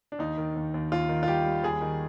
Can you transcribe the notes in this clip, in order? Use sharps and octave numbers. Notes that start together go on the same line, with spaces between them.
D4
D#2 D#4
D#3
D#2
D#2
D#2 F4
D#3
F4
G3 G4
G3
D#2 G#4
D#3